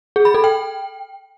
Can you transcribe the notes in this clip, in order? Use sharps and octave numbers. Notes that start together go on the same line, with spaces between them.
G#4
B5
A4
G5